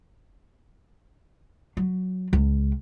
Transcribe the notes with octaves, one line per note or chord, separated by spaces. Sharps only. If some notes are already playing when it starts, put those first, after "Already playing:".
F#3
C#2